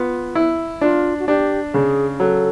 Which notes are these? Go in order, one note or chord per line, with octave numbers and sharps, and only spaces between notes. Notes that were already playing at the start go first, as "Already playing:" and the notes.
Already playing: B3 F4
E4
D4 F4
F#4
D4 G4
C#3 G#4
F#3 A4